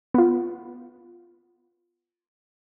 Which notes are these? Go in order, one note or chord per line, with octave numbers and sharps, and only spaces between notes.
B3 F4